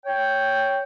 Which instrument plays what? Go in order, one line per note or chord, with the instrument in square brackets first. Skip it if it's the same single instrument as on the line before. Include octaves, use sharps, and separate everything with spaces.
[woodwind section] C#5 G5